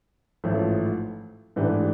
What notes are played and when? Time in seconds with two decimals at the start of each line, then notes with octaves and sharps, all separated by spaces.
0.44 A1 G#2 F3 A3
1.56 G#2 E3 A3 D4 G4